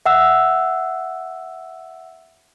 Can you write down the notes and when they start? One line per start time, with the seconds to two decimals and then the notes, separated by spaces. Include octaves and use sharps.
0.06 E5 F#5 E6